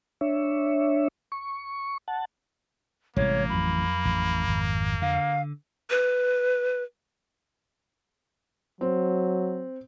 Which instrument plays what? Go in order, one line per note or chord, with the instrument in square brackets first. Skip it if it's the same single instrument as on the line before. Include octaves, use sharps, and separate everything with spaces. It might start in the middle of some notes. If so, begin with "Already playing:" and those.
[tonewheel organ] D4 C#5 E5
C#6
F#5 A5
[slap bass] A1 E3 [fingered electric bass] C3 G3 G#3 [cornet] A#3 [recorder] C#5
[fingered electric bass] F2 F#3 [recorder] B5
[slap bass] A1
G#1
[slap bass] D3 [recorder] F5
[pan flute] B4
[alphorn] F#3 [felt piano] C4